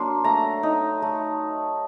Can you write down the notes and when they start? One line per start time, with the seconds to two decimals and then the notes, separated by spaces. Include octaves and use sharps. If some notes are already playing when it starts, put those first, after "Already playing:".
Already playing: F#3 A#3 D4 C6
0.24 A3 A#5
0.63 D#4
1.02 A3